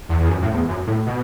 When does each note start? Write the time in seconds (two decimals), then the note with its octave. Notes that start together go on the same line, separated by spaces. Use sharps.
0.09 E2
0.19 E2
0.29 F#2
0.42 A2
0.54 E2
0.68 F#2
0.87 A2
1.06 B2